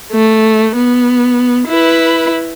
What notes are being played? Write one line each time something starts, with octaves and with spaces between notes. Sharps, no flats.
A3
B3
E4 B4